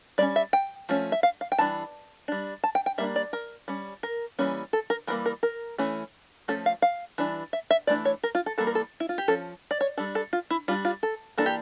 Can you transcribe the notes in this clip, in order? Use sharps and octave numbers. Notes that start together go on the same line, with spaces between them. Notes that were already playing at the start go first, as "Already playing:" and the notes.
G3 A#3 C#4 D5
E5
G5
F3 A3 C#4
E5
F5
F5
G5
E3 G3 D4 A5
G3 D4
A5
G5
G5
G3 A#3 D4 E5
D5
A#4
G3 C#4
A#4
E3 G3 A#3 C#4
A4
A#4
E3 G3 A#3 A#4
A#4
A#4
E3 A3 C#4
F3 A3 C#4 A4
F5
F5
E3 G3 D4
E5
E5
E3 A3 D4 D5
C#5
A#4
F4
A4
E3 G3 A#3 A4
A#4
A4
E4
F4
G4
F3 C#4 A4
D5
C#5
G3 D4 A4
A4
F4
E4
G3 D4 F4
F4
A4
E3 A#3 D4 A4
G4